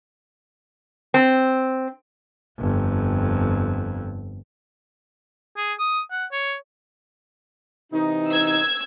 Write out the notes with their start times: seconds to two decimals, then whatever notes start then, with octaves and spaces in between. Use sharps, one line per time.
1.14 C4
2.59 G1 F2
5.57 G#4
5.79 D#6
6.11 F#5
6.32 C#5
7.92 C3 E3 D#4
8.30 E6 G#6